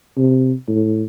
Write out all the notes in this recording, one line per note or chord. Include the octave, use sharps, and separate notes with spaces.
C3
A2